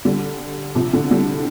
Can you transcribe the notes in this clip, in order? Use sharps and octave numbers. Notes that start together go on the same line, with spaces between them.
D3 G3
C3 F3
A2 D3
D3 G3